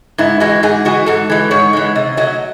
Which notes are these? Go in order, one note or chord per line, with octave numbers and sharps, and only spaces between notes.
G#2 E4
E3 G#3 F#4
G#2 G#4
E3 G#3 F#4
G#2 A4
E3 G#3
G#2 C#5
E3 G#3
C3 D#5
F#3 A3 D#5